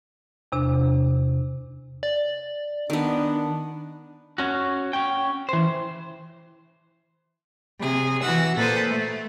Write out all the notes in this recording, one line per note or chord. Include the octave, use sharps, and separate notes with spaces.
E2 C3 D4
D5
D#3 B3 D4
C#4 F#4
C#4 G5
E3 C5
C3 G#4
E3 F#4 F#5 E6
A#2 A4 B4 C5 D#6
A3